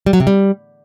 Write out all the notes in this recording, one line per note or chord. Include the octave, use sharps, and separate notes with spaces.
G3
F#3
C3
G3